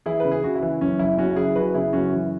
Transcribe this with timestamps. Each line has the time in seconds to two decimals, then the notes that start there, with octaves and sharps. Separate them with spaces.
0.06 E3 E4 G#4
0.20 C#3 B4
0.32 G#4
0.43 C#3 F#4
0.55 E4
0.63 E3
0.81 F#2 C#4
0.99 F#1 E4
1.18 C#3 C#4 F#4
1.36 F#2 E4 G#4
1.55 F#1 F#4 B4
1.74 C#3 E4 G#4
1.93 F#2 C#4 F#4
2.13 E3